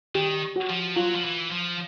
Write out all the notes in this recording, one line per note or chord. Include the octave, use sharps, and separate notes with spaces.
D#3 G4
F#4
F3
F#3 F4
F3
E3
F3